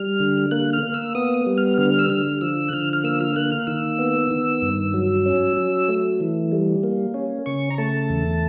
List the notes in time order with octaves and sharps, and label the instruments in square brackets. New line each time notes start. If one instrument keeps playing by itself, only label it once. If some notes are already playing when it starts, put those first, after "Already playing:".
Already playing: [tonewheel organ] G3 F6
D3
A#3 F#6
F6
A#3
E6
B3 D#6
G3
F6
D3 F6
E6
D3 F6
F3 E6
F#6
D3 F6
F6
A#3 E6
F6
A#3 F#6
F6
D#3 E6
B3
D#3
G2
F#3
C#4
F#3
A3
E3
G3
A#3
C#4
C#3 C#6
A#5
A3 A5
E2